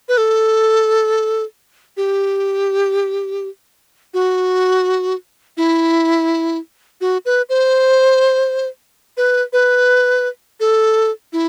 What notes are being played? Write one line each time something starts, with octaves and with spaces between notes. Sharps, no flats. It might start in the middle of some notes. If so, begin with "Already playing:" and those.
B4
A4
G4
F#4
E4
F#4
B4
C5
B4
B4
A4
E4